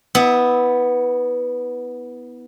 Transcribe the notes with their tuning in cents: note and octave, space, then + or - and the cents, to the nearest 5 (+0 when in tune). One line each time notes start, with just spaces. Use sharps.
B3 +0 E4 -35